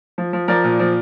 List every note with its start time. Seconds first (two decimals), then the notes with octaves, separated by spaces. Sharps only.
0.18 F3
0.33 F3
0.48 F3 A#4 D5
0.64 A#2
0.79 F3